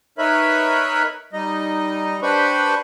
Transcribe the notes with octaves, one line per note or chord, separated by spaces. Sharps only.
D#4 A#4 B4 C#5 E5 B5
G3 D#4 D#5
D4 G4 B4 C5 B5 C#6